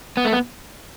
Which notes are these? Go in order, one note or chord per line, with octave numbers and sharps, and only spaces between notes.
B3
A3
B3